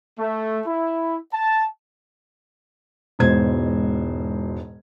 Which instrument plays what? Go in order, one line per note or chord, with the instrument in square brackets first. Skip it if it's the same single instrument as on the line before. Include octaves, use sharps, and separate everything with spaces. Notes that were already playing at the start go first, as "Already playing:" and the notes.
[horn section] A3
E4
A5
[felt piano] E1 G#2 B2 C5 G#6